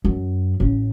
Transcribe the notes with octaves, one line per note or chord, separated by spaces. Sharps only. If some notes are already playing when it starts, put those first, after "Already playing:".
F#2
A1 C#4